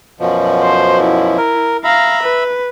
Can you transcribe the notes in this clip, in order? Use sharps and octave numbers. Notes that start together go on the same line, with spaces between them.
F#2 B2 F3
C5
E4
A#4
E5 F5 A#5 B5
B4